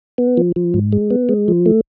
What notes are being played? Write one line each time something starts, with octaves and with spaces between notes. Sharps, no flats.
B3
F3
F3
G#2
G#3
B3
G#3
F3
A3